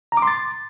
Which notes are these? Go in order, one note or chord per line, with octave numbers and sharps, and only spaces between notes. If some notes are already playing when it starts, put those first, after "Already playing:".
A#5
D6
C6
A6